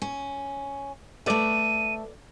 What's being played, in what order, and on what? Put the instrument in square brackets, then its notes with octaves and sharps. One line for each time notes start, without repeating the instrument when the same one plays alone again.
[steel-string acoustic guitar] C#4
[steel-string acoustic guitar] A3 E5 [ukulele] A4 B4 D5 [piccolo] D#7